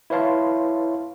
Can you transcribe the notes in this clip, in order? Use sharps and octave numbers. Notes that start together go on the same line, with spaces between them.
E4 B4 C#5 F5 A5 C6